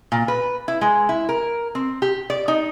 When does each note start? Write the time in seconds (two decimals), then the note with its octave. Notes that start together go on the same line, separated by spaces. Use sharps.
0.12 A#2
0.28 B4
0.68 E4
0.81 G#3
1.09 E4
1.29 A#4
1.75 C4
2.02 G4
2.30 D5
2.48 D#4